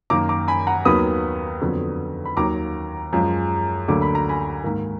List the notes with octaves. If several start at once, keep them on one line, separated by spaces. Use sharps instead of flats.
F#2 D#3 A#3 A#5 D6
A#5 D6
G#5 B5
F#5 A#5
D#2 D#3 F#3 B3 B5 D#6
F2 D3 F#3 B3
B5
D#2 D#3 F#3 A#5 D6
F#2 F3 G#3
D2 D3 F#3 A#3 D6
B5
A#5
G#5 B5
G#2 D#3 A#3